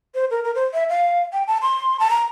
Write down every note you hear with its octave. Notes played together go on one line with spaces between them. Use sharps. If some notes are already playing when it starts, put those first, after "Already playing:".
C5
A#4
A#4
C5
E5
F5
G5
A5
C6
A5
A#5